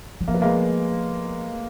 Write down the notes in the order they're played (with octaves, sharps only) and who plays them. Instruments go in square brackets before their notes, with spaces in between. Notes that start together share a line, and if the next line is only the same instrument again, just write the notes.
[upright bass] F#3
[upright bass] F3 [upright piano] A#3
[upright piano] B3
G#3 A#3